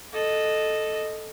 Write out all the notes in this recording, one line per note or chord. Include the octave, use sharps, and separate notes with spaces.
A4 D#5